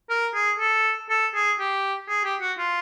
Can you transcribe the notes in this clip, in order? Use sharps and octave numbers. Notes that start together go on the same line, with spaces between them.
A#4
G#4
A4
A4
G#4
G4
G#4
G4
F#4
F4